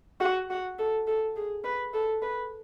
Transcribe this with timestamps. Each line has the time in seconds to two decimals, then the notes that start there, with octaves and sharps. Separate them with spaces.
0.21 F#4
0.50 F#4
0.79 A4
1.07 A4
1.36 G#4
1.64 B4
1.94 A4
2.22 B4